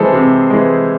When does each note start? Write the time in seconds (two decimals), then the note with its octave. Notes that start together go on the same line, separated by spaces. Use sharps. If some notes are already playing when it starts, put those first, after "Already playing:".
Already playing: C3 E3 G#3 G#4 A4 C5
0.13 C3
0.50 E3 G#3